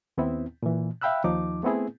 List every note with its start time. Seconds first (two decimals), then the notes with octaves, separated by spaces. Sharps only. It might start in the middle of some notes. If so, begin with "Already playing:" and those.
0.18 D#2 B3 C4 E4
0.63 A#2 E3
1.01 E5 F5 G5 B5 E6 F#6
1.24 D#2 F3 D#4 D6
1.63 A3 B3 C4 E4 G#4